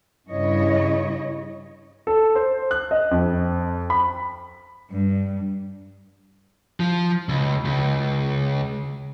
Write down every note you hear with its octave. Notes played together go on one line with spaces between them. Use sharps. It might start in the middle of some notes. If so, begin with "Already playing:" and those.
G2 C#3 E4 C#5 D#5
A4
C5
F#6
D#5
F2
B5
G2
F3
C#2
C#2